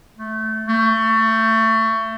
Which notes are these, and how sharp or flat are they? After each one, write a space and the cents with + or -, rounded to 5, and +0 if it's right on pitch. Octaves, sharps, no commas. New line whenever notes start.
A3 -10
A3 +25